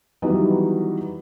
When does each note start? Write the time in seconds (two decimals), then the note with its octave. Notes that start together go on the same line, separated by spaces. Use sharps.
0.22 D#3 E3 F#3 G3 B3 D#4